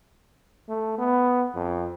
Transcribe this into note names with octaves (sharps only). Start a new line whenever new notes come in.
A3
B3
F2